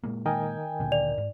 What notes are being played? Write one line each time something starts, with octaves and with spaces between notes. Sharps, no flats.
A#2 G#3 A#3
D#3 A#4 D#5 G5 G#5
D1 A#2 D3
D5 F7
G#2